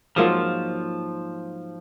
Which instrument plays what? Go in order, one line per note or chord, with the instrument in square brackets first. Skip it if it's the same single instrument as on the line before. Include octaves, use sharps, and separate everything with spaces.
[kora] G#2 F#3 A#3 F4 [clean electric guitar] F3